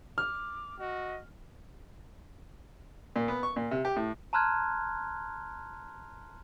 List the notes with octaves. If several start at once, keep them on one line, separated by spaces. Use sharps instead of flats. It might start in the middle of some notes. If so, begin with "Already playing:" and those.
D6 F6
F#4 D#5
A#2
B3
C#6
A#2
C3
G4
A2
A5 A#5 C6 F6 F#6 G#6